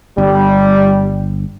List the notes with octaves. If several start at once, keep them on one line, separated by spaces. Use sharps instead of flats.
G1 G3